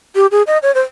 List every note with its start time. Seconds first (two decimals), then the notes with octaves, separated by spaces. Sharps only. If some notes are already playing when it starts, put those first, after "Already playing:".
0.15 G4
0.31 G#4
0.47 D#5
0.63 C#5
0.75 C5